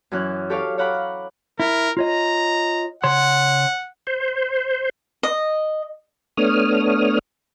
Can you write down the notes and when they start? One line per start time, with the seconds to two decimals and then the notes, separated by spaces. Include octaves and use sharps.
0.12 F#2 E3 C#4 F#6
0.50 G4 A4 C#5 F5 D6
0.78 C#5 F5 F#5 A#5 B5 D6
0.93 F#6
1.60 E4 A#4
1.97 F4 C#5 D#5 A#5
3.04 C#3 C#5 F#5 C6
4.07 C5
5.23 D#5
6.37 A3 B3 D4 C#5 D#6 F6